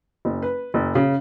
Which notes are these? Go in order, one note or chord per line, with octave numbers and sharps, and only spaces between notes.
F#1
B4
F#1
C#3